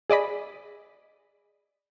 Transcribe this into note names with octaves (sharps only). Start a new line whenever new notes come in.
G#4 D5 D#5 B5